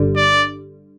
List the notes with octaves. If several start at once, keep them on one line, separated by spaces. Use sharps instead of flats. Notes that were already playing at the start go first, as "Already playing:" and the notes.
Already playing: G1 G2 D3 G3
D5